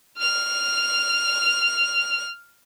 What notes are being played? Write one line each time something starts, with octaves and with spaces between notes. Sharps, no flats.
F6 F7